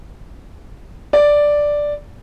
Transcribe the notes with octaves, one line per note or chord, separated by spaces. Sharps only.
D5